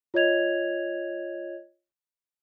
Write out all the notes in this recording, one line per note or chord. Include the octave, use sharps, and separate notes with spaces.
F4 C#5 D#5 G#6 F7